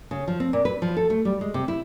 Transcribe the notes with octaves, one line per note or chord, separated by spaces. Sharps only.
C#3
F3
C4
A#2
B4
F3
A4
A3
G3
G#3
C3
E4